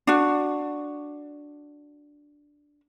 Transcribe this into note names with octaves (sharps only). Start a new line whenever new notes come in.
D4 F#4